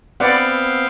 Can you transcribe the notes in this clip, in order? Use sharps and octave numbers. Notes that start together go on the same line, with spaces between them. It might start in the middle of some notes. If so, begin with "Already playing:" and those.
B3 C4 B4 D5 F5 F#5